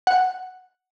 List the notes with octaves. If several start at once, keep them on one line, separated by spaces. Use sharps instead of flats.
F#5